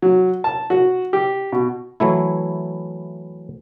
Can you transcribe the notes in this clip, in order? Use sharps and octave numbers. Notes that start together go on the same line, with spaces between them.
F#3
A5
F#4
G4
B2
E3 F#3 A3 E4